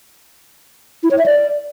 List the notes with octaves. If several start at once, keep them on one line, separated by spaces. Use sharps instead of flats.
E4
C#5
E5
D5